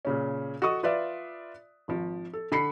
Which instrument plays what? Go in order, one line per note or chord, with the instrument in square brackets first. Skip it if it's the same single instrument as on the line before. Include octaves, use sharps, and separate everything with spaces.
[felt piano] A#2 C#3 C#4
F#4 A4 D#5 C#6 D#6
F4 B4 D5 E5
G#1 F3
A4
D3 B5 C7 C#7